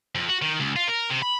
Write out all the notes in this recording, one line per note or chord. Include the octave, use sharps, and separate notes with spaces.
F2
F#4
D#3
C#2
F4
A#4
C3
B5